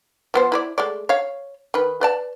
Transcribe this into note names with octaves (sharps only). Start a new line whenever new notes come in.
F3 B3 C5
E4 B4 D5
G#3 A3 D5
C#5 F5
D#3 B4
B4 D5 A5